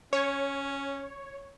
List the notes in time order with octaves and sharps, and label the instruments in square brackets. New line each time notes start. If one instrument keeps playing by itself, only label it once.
[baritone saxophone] C#4 [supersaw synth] C#5